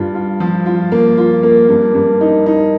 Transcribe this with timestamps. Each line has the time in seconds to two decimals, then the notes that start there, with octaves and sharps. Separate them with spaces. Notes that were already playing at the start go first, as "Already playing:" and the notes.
Already playing: G2 F4
0.15 F4
0.40 F3
0.66 F4
0.92 A#3
1.17 F4
1.43 A#3
1.69 G2
1.95 G2
2.21 D#4
2.46 D#4